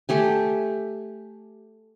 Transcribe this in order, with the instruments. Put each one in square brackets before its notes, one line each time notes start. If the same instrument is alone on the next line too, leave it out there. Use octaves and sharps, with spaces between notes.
[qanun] A3 G4 G#5